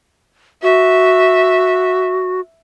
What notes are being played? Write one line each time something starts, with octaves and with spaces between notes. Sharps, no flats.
F#4 E5